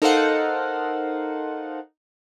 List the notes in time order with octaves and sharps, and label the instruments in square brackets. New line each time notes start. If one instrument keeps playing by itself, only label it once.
[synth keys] D#4 A4 A#4 C5 F5 F#5